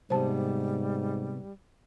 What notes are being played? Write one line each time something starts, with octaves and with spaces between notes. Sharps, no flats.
G#2 C3 G3 B3 C5 A5